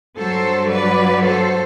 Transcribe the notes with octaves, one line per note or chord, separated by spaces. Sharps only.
G2 F#3 A4 C5
B4 D5
A4 C5